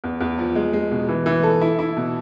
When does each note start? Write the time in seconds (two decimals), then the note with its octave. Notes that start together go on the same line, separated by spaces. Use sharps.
0.04 E2
0.21 E2
0.38 F3
0.55 G#3
0.73 G#3
0.91 B2
1.09 E3
1.26 E3
1.43 A4
1.62 E4
1.79 E4
1.97 B2